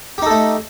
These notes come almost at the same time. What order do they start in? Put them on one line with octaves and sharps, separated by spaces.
G4 D#4 A4 A3